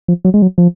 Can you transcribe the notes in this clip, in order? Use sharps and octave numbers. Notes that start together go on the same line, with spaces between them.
F3
F#3
G#3
F#3
F3